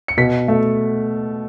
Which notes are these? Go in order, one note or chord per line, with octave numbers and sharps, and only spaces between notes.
C#7
B2 B6
A3